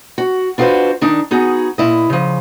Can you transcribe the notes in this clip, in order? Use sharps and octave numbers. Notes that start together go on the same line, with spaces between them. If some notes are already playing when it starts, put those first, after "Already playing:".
F#4
D4 F4 F#4 A4 B4 C5
D#3 D4 D#4
B3 D#4 F#4 G#4
A#2 E4 D#5
C#3 F3